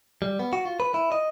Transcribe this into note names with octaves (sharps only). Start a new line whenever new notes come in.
G3
B3
F#4
F4
B4
E4
D#5